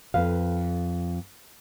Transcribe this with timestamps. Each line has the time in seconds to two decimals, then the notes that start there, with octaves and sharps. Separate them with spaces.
0.14 F2 B4 F5